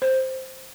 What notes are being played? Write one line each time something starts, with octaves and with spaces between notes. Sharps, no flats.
C5